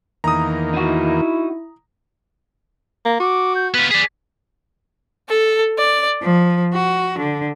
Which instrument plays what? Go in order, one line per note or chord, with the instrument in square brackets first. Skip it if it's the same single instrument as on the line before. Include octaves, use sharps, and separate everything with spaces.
[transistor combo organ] E2 D#3 A#3 [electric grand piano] A#5 D#6
[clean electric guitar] D#4 F#4 [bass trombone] E4
[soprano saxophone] A#3
[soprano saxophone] F#4 [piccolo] D6
[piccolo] G6
[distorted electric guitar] B3 F4 [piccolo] B6
[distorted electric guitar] G#4 D5 [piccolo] B6
[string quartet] A4
D5
F3
F#4
D3